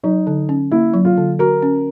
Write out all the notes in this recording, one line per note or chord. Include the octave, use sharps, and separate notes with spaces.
F#3 D#4
D3
C#4
A#3 E4
F#3
F4
D3
F#4 A#4
C#4